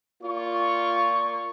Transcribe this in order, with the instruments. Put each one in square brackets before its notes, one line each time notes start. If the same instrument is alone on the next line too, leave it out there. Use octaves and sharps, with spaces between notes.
[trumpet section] A#3 D5 C#6 [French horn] F4